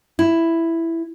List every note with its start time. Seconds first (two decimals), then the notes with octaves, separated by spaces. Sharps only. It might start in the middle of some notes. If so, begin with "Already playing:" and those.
0.19 E4